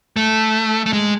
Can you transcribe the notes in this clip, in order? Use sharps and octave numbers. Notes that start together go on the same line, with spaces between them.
A3
A3
G#3